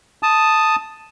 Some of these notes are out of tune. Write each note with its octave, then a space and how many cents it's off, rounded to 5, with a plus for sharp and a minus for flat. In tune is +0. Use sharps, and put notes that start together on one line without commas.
A5 +0 D#6 +0